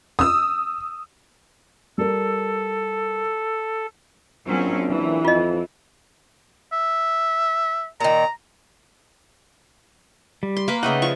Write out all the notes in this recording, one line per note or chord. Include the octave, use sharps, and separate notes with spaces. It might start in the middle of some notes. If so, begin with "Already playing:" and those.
D#6 E6
G3 A4 A#4
A#1 F#3 C4 C#4
E3
F2 F4 D#5
E5
A#2 D#3 A#5
G3
C6
A#3 B4
C#3 A3 D#4 D#5 F#5 G5
F3 C#6